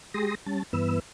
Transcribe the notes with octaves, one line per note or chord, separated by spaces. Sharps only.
G#3 G4 G#4 C6 D#6 A#6
G3 C#4 A5
G2 E3 B3 B4 E6